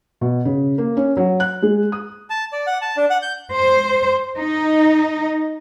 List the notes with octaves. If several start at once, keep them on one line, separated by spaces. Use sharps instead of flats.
B2
C#3
A#3
C#4
F#3
F#6
G#3
D#6
A5
D5
F#5
A5
D4
F#5
G6
C5
D#4